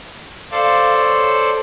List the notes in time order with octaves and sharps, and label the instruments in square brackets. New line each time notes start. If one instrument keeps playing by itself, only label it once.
[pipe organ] A4 C5 D5 [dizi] F5
[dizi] C#5